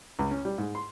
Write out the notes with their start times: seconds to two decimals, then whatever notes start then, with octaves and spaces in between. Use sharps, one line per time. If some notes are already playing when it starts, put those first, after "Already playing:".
0.19 C#2
0.31 C#4
0.45 G3
0.58 G#2
0.75 C6